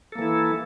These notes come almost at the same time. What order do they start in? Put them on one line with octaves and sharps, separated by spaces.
A4 A#3 E3 E4